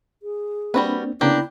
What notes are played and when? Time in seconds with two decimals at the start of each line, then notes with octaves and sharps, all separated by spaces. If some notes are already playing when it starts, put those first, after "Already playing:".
0.23 G#4
0.74 G3 A#3 C4 D4 F#4 B4
1.21 C#3 A#3 B3 D4 E4 G4